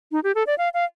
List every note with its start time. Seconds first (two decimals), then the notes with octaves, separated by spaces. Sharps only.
0.12 D#4
0.24 G4
0.35 A4
0.47 D5
0.58 F5
0.74 F5